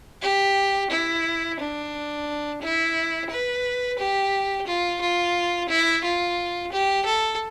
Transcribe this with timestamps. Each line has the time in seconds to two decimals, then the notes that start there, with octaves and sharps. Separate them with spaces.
0.22 G4
0.90 E4
1.59 D4
2.62 E4
3.30 B4
3.98 G4
4.67 F4
5.01 F4
5.69 E4
6.04 F4
6.72 G4
7.05 A4